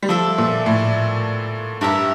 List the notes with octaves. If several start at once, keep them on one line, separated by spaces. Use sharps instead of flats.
G3
F3 D4 A4 E5
A#2
A2
G2 E4 G4 A#4 E5